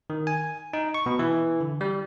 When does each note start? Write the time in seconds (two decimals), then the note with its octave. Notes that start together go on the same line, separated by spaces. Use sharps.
0.10 D#3
0.27 G#5
0.73 D#4
0.94 C#6
1.06 B2
1.19 E3
1.61 D3
1.81 G3